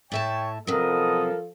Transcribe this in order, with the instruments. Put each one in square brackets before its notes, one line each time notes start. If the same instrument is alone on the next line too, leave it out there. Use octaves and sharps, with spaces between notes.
[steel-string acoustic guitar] A2 E5 A5 [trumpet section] C#5 G5
[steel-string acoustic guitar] C3 F#3 [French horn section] F3 A4 [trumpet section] B3 D#5 D#6 [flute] A#4